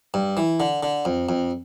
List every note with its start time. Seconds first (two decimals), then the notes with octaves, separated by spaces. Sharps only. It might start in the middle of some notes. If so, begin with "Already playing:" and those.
0.14 G2
0.37 E3
0.60 D3
0.83 D3
1.05 F2
1.29 F2